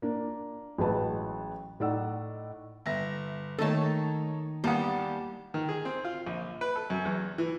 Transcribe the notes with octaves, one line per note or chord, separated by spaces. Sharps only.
A#3 D4
A1 F#3 G#3 B4 A5
A2 D#4 D5 F#5 E6
G1 E5 A#6
D#3 A3 A#3 D#4 A4 C#5 A5
E2 G3 A#3 F5 F#5 A5
D#3
G#4
C4
F4
A#1
B4
A4
F#2
E2
E3